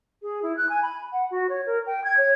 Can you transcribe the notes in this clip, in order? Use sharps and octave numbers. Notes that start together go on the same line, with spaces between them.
G#4
E4
F#6
G#5
B5
F#5
F#4
C#5
A#4
G5
G#6
C#5